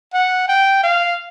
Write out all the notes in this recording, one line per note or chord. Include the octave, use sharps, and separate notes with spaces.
F#5
G5
F5